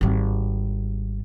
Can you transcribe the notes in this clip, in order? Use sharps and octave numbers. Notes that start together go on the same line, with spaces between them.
G#1 G3